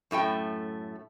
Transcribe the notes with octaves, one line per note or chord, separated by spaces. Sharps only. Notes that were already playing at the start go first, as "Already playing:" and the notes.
F#2 A2 A3 G5